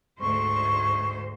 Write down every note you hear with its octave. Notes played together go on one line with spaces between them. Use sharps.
D2 G#2 C5 C#6